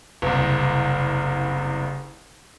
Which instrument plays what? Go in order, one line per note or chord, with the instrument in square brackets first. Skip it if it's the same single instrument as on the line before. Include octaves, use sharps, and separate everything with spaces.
[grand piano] F#1 C2